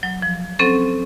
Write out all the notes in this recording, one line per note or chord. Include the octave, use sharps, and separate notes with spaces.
F#3
F3
F#3 C4 C#4 A4 C5